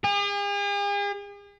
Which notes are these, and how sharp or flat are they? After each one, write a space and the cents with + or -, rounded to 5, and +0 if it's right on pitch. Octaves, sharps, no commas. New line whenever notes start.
G#4 -45